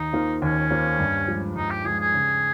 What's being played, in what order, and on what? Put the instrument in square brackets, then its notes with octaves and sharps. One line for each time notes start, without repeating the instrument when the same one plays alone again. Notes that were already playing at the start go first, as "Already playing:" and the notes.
Already playing: [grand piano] D#2 [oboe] D#4
[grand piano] D#3 A#3 F4 C5
[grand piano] D#2 [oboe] C#4
[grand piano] D#3 A#3 F4 C5
G2
F3 G#3
[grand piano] G2 [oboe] D#4
[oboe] G4
[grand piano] F3 G#3 [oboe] G#4
[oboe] G#4
[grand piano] C#3